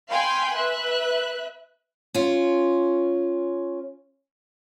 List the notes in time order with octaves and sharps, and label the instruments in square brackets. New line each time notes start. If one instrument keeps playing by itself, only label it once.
[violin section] F5 G5 G#5 B5 C6 G6
B4 E5 F#6
[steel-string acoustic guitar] C#4 F4